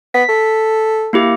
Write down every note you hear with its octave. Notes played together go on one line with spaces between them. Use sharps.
B3 B6
A4
A#3 E4 G4